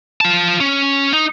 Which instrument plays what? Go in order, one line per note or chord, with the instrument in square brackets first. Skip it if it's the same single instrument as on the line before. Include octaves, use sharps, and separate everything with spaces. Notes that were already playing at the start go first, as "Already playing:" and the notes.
[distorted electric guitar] F4 A5
C#4
D#4